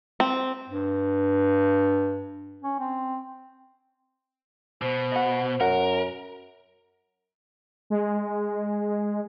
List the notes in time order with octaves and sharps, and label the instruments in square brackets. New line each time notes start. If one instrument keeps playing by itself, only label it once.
[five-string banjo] C4
[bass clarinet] G2
C#4
C4
[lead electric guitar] B2 [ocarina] C5
[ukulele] D#5 F#5
[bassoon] F#2 [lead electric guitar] A#4 [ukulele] F#5
[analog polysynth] G#3